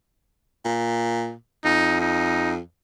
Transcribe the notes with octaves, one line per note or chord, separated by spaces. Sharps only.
A#2
F2 D#4
D#4